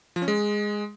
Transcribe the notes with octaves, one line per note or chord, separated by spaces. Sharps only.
F3
C#4
G#3